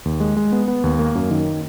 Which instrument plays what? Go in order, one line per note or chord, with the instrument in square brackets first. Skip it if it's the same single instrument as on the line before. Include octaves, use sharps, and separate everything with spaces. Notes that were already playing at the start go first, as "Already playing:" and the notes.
[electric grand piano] D#2
G#3
G#3
B3
B3
D#2
A#3
F#2
D#3